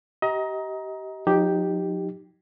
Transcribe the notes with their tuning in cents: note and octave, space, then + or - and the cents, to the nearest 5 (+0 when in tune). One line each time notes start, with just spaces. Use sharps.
G4 -25 D#5 +30 A#5 +15
F3 +45 D#4 +0 G4 +0